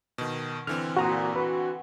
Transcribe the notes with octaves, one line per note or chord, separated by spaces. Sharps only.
B2 D#3
D3 E3 C4 F6
A#2 F#4 A#5 D#6
F#4 B4